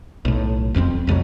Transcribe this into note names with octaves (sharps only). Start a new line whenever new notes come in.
B1 A2
D#1 F2 F3 C4
C2 F2 F3 F#3